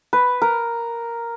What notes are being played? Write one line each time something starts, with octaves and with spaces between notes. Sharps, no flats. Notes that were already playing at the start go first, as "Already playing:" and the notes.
B4
A#4